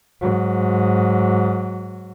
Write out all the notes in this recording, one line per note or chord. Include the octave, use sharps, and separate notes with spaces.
G#2 F#3